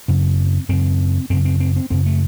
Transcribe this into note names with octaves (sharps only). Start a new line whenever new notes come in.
F#2 C#3 C4
F#2 C#3 C4
F#2 C#3 C4
C4
C4
C4
F#2 C#3 C4
A3